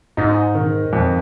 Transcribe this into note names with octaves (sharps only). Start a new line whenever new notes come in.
G#2 D#4
D#3
F2